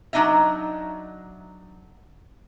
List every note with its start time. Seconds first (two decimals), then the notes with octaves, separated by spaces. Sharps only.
0.13 F#3 D4 D#4 D#5 E5